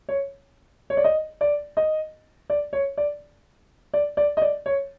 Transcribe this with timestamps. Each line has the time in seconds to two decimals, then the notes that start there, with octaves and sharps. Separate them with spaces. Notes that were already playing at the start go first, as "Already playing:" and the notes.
0.09 C#5
0.90 C#5
0.97 D5
1.04 D#5
1.41 D5
1.77 D#5
2.50 D5
2.73 C#5
2.97 D5
3.94 D5
4.17 D5
4.37 D#5
4.42 D5
4.66 C#5